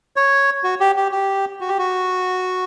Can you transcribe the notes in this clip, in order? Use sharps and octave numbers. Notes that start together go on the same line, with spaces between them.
C#5
F#4
G4
G4
G4
F#4
G4
F#4